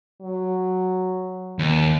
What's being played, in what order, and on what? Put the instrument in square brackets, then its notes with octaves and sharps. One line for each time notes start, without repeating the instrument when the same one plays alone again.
[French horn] F#3
[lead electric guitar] D#2